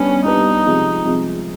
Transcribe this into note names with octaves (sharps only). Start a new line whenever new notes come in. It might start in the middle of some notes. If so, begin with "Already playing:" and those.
Already playing: G3 B3 C#4 D4 G4 B4
G3 B3 D4 D#4 G4 B4
C3 F3 G#3
C3 F3 G#3